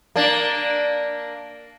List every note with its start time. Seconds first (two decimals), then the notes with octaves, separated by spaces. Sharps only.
0.16 A#3 D4